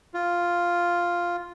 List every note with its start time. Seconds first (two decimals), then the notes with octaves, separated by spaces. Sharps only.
0.14 F4